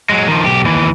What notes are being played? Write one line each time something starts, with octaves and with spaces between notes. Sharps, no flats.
F#3 G#3
D#3 F3
B1 G4
D#2 E3